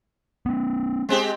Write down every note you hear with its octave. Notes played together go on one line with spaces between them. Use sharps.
B3 C#4
G#3 C4 G4